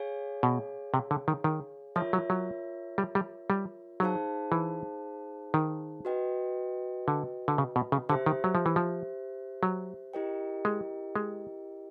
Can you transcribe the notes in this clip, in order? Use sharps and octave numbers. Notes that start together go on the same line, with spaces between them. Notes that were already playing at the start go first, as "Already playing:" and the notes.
Already playing: G#4 C#5 F5 G#5
B2
C3
D3
D#3
D#3
F3 F4 A#4 C#5 E5
F#3
F#3
G3
G3
G3
F#3 D#4 G#4 C5 F5 A5
E3
D#3
F#4 B4 D#5 G5
D3
D3
C#3
B2
C#3
D3 G4 C5 E5
D#3
F#3
F3
E3
F3
F#3
E4 G4 A#4 D#5 G5
G#3
G#3